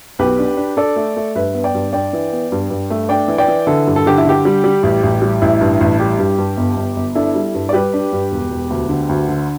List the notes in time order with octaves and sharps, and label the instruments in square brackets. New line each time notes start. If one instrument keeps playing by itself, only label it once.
[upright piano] B1 G4 B4
D4
D4
D4 A4 D5
A3
A3
G2 B4 E5
B3
D5 G5
G2
D4 D5 G5
E3
B3
G2
G2
A3
D4 D5 G5
E3
D5 G5
E3
D3 E4 A4
G2
A4
D3 G4
E4
D3 G4
G3
G3
A1
A1
G3
A1 E4
G2
A1
G3 G4
G2
G2
G1
G1
G1
D4 E4 A4
G3
G2
D5
G3 G4 B4
D4
G2
E1
E1
D2
D3
D2
D3